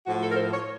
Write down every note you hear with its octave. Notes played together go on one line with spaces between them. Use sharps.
A2 F3 F#4
A4
A#4
C5
C#5